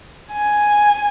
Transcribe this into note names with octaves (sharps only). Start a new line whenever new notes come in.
G#5